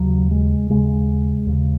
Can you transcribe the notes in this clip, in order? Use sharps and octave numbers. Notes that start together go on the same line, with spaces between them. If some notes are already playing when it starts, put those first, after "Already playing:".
Already playing: D#2 C#3 F#3
G#3
D#2 C#3 G#3
D#2 C#3